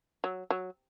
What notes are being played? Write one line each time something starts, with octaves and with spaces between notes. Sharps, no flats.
F#3
F#3